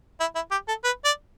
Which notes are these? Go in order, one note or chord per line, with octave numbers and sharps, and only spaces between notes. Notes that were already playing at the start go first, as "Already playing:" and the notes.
E4
E4
G4
A4
B4
D5